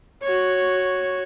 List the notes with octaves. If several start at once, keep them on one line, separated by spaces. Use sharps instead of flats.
F#4 C#5